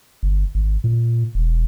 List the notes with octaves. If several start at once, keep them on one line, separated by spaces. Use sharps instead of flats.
G1
G#1
A#2
E1